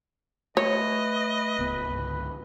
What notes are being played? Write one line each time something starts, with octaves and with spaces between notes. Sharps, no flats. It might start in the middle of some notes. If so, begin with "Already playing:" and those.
A3 B4 C#5 D#5
D1 C#2 B3
C#2 G#2 D3